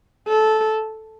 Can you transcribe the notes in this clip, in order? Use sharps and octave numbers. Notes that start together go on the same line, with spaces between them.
A4